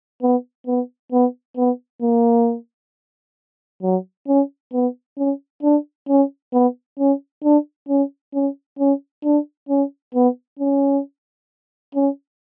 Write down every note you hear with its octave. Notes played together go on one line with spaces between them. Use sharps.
B3
B3
B3
B3
A#3
F#3
C#4
B3
C#4
D4
C#4
B3
C#4
D4
C#4
C#4
C#4
D4
C#4
B3
C#4
C#4